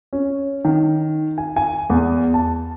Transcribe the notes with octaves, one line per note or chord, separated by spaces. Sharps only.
C#4
D#3
G#5
G#5
E2
A5